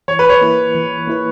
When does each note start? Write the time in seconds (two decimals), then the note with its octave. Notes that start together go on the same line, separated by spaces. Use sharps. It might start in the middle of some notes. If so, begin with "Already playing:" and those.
0.08 E3 C#5
0.19 B4
0.29 C#5
0.42 A#3 E4 B4
0.75 E3
1.07 A#3 E4 B4